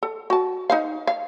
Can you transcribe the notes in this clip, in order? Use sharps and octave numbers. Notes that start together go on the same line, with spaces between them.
A4
F#4 A5
D#4 C5 F5
F5